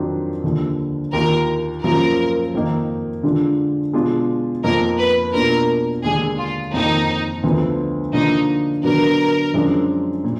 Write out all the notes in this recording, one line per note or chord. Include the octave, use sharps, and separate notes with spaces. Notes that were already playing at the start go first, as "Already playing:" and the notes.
Already playing: F2 D#3 F#3 D4 F4
D#2 D3 F3
D#2 D#3 A#3 F4 A#4
F#2 F3 A#3 F4 A#4
F2 D#3 A#3 D#4
D3 G#3 D4 F4
B2 G#3 D4 F4
F2 F3 A#3 D#4 A#4
B4
B2 A#3 D4 F4 A#4
D#2 D3 G#3 D4 G#4
F4
F2 D#3 A#3 D#4
D2 D3 F3 B3
D3 F3 A#3 D4 D#4 F4
D3 F#3 B3 D4 A#4
F#2 F3 G#3 D4 F4
A#2